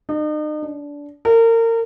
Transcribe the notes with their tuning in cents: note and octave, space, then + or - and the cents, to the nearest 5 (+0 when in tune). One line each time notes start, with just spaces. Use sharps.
D#4 -40
D4 -20
A#4 -30